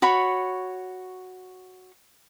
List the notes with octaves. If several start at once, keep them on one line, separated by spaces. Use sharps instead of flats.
F#4 C#5 B5